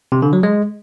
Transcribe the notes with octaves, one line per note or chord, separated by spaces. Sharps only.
C3
D3
F#3
G#3